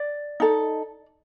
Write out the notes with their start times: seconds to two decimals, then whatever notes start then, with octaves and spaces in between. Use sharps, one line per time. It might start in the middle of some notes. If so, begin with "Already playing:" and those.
Already playing: D5
0.40 D#4 A4